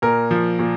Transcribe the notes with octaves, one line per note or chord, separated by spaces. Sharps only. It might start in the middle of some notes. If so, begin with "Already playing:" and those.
A#2 A#4
F3
A#2